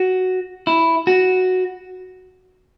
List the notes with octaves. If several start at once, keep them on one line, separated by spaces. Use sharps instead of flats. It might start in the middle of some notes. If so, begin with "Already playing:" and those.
Already playing: F#4
E4
F#4